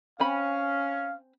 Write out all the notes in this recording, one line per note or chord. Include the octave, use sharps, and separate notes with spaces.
C4 C#4 F5 G#5 B5